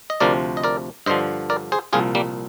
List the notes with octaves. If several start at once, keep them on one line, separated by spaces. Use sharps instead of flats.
D#5
D2 C3 F3 A#4 D5
D#5
A#4 D5
G2 D3 F3 C5 D#5
A#4 D5
G#4 C5
C2 A#2 F3 F4 G#4
G3 A#3